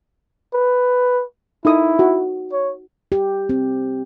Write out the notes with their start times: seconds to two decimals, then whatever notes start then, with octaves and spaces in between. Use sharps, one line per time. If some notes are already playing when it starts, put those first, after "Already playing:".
0.54 B4
1.65 D#4 E4 A4 D#6
1.99 F#4
2.52 C#5
3.12 G4
3.49 C4